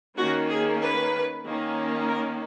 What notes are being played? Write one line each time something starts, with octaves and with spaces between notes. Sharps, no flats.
D#3 A#3 C#4 F#4
G#4
B4
D#3 A#3 C#4
A#4